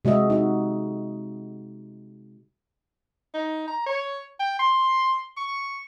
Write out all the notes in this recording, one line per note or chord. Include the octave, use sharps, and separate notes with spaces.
C3 G#3 F#4 D#5 E5
D#4 F#4
D#4
A#5
C#5
G5
C6
C#6